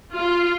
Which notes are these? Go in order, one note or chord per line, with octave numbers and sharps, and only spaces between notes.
F4